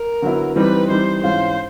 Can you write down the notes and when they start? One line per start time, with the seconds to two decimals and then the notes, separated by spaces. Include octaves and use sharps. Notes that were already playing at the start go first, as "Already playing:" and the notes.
Already playing: A#4
0.22 D3 F#3 B3 E4
0.56 E3 G3 C4 D#4 B4
0.90 E3 G3 C4 D#4 C5
1.23 G#2 E3 G#3 C#4 F4 C5